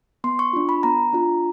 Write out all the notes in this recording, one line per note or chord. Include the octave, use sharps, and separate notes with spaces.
B3 C6
C#6
D4 F4
B5
B3 A#5
D4 F4